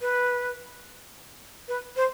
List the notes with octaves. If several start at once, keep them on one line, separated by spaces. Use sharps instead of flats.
B4
B4
C5